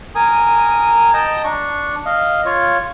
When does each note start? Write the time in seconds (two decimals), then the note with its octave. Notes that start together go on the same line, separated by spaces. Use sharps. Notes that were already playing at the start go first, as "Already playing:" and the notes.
0.15 A#4 G#5 D#6
1.14 D#5 G5 A5 A#5
1.44 D4 C#6
2.06 D#5 F5
2.45 F4 C#5